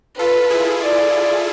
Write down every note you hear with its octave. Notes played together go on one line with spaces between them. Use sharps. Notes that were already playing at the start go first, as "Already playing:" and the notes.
F4 A4 B4
E4 G#4
D5